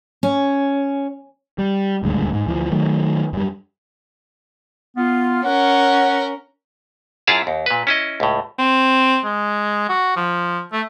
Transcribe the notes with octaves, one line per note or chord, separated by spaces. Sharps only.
C#4
G3
D#1 D2 G2 G#3
G#2
D2 E3 F3
D#3 F#3 A3
F#2 G3
B3 F4
C#4 A#4 F#5
F#2 E4 F4 G#4 F5 A5
D#2
A#2 B4
C#4 E4 D#5
C#2 A2
C4
G#3
F#4
F3
A3